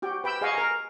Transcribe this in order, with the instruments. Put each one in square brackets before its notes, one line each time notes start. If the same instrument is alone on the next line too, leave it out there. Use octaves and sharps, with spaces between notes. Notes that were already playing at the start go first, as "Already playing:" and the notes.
[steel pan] F#4 G4 G5
B4 G5 B5 E6
G#4 D#5 F5 F#5 G#5 C#6
A#4 G#5 A#5